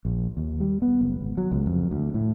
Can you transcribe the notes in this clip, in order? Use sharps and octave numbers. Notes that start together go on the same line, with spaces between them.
A#1
D#2
G3
B3
F#1
G#1
F#3
C#2
F2
D2
A2